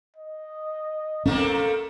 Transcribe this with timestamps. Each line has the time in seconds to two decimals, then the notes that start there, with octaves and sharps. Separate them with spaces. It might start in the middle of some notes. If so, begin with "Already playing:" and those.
0.16 D#5
1.26 A3 A#3 C4 C#4 A#4